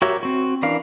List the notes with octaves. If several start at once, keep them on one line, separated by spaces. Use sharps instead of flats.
F#4 G4 A#4 C#5 E5
C4 F#4
E3 C#4 D4 A#4 F5